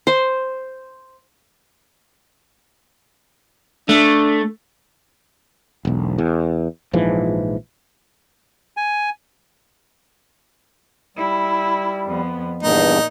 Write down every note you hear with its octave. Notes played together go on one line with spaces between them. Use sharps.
C5
A3 D4
E1 B1
E2
A#1 G#2 E3 F3
G#5
G3 E4
F2 B3
E2 G2 A#2 D#4